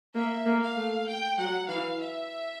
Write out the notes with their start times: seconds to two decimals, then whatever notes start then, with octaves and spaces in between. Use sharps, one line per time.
0.15 A#3 E5
0.45 A#3
0.61 F5
0.76 A3
1.07 G5
1.38 F#3 F#5
1.69 E3 F5
1.99 E5